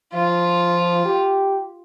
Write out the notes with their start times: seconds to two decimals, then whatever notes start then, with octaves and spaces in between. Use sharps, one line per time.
0.14 F3 F4
1.06 G4